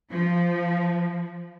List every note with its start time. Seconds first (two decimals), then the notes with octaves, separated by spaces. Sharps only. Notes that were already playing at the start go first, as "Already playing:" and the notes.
0.11 F3